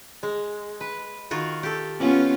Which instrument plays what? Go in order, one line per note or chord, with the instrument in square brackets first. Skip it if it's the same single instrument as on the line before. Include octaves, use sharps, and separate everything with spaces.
[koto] G#3
B4
D#3 F4 F#4
G4 A4
[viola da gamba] B3 C#4 F4